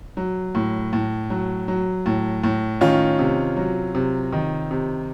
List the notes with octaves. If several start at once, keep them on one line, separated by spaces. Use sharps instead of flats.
F#3
A2
A2
F#3
F#3
A2
A2
D#3 C#4 F4
C3
F#3
C3
D#3
C3